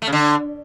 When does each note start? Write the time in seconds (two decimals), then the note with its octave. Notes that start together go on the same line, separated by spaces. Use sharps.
0.02 A3
0.07 C#3
0.12 D3